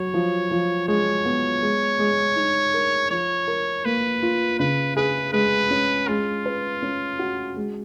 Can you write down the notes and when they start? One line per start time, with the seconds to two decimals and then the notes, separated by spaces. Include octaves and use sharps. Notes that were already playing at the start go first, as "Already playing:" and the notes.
Already playing: F#3 C#5
0.14 F3
0.51 F3
0.88 G#3 C#5
1.25 B3
1.62 G#3
1.99 G#3
2.36 D#4
2.74 A#4
3.10 F3 C#5
3.48 A#4
3.85 A#3 B4
4.23 F4
4.59 C#3 B4
4.96 G#4 B4
5.33 G#3 B4
5.70 C#4
6.08 G#3 F4
6.46 B4
6.82 C#4
7.19 F#4
7.56 G#3